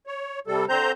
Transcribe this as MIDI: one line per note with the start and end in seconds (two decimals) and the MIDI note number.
0.07 0.40 73
0.47 0.65 48
0.47 0.65 55
0.47 0.65 69
0.69 0.92 50
0.69 0.92 60
0.69 0.92 72
0.69 0.92 82
0.69 0.92 91